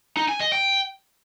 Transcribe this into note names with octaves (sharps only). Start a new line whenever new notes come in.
D#4
G#5
D#5
G5